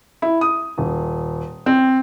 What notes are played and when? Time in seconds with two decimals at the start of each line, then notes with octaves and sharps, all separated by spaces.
0.22 E4
0.41 D#6
0.78 D#1
1.66 C4